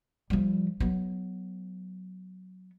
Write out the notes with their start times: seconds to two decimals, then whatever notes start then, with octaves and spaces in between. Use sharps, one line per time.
0.30 F3 G3
0.80 F#3 B3